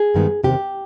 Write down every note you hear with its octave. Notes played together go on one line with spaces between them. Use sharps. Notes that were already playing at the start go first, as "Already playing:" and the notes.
Already playing: G#4
G2 D#3 G#3 B3
E2 C3 D#3 G4